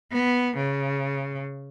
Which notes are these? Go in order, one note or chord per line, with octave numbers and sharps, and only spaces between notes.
B3
C#3